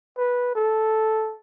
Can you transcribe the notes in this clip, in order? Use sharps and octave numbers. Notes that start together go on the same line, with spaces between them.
B4
A4